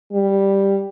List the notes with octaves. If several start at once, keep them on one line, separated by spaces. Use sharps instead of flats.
G3